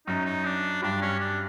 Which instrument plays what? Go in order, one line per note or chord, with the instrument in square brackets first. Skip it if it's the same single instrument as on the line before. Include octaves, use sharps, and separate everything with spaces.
[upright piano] F#2 F#3 [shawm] D#4
[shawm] D#4
D4
[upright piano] G2 G3 [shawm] D4
[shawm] C#4
D4